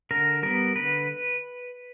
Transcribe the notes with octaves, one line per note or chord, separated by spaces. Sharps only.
D3 A#4
G3 B3 A#4
D3 B4